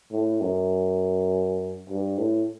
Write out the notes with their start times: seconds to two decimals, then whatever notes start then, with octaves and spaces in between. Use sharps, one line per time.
0.11 A2
0.41 F#2
1.89 G2
2.18 A2